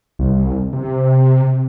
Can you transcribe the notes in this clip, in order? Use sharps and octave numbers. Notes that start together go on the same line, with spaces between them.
C2
C3